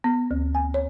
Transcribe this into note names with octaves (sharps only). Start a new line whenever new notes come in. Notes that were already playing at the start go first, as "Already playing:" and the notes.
B3
D2
G#5
C#5